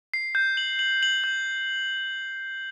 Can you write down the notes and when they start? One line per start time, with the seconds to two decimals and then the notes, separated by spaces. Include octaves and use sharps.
0.14 C7
0.35 G6
0.57 F#7
0.79 F#7
1.03 F#7
1.24 G6